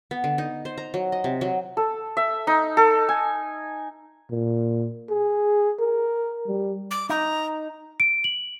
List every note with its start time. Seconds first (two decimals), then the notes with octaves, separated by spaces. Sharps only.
0.11 B3
0.24 D3
0.38 D#4
0.65 C5
0.78 A#5
0.94 F#3
1.12 D#5
1.24 C3
1.41 F#3
1.77 A4
2.17 E5
2.47 D#4
2.77 A4
3.09 G#5
4.31 A#2
5.10 G#4
5.80 A#4
6.47 G3
6.91 D6
7.09 D#4 A#5
8.00 D7
8.24 F#7